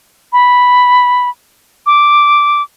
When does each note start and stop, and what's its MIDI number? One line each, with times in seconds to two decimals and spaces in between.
0.33 1.29 83
1.86 2.62 86